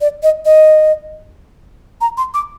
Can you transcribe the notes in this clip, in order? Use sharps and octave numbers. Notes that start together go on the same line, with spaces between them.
D5
D#5
D#5
A#5
C6
D6